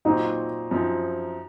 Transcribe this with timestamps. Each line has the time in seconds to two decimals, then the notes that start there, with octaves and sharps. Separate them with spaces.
0.05 A#2 F#3 C4 D#4
0.71 F#2 F3 C4 D#4